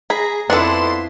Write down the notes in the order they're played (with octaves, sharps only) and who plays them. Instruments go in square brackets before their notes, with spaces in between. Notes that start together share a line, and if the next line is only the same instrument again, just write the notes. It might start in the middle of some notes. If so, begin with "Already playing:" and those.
[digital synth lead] G#4 [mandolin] A#5 [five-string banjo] B5
[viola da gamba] F2 E4 [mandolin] B3 F#5 A5 [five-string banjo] D4 A4 [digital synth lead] C6